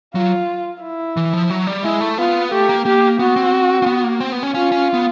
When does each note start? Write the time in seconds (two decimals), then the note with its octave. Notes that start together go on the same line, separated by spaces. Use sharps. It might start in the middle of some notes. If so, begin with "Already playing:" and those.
0.14 F#3 F4
0.82 E4
1.17 E3
1.33 F3
1.50 F#3
1.67 G3
1.84 G#3 E4
2.01 A3
2.18 B3 F4
2.52 A3 G4
2.69 A#3
2.85 A#3 G4
3.19 B3 F#4
3.36 C4
3.82 C4
3.86 B3
4.04 A#3
4.20 C4
4.32 B3
4.43 C#4
4.54 C#4 F4
4.72 C#4
4.94 B3